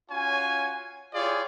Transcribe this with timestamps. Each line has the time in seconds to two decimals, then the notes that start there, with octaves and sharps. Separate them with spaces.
0.11 C#4 F4 F#4 C#5 G#5
1.14 E4 F4 G4 G#4 C#5 D5